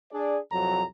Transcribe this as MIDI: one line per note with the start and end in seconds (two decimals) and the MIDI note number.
0.12 0.38 62
0.12 0.38 68
0.12 0.38 74
0.52 0.83 36
0.52 0.83 41
0.52 0.83 54
0.52 0.83 82